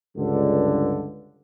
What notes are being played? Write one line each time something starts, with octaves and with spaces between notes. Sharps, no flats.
C#2 G2 D3